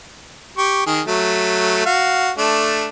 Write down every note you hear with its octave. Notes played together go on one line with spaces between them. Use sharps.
G4 C#6
D#3 G#4
F#3 A3
F#4 F5
A3 D4